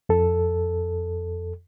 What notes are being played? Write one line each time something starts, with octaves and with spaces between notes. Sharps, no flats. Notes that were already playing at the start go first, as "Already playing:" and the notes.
F2 A4